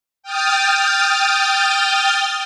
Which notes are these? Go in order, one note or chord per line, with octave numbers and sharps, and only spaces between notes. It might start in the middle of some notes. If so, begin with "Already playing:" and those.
G5 D#6 F6 G6 A6